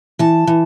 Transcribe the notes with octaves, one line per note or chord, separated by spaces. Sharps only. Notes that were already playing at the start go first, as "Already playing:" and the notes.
E3 A5
E3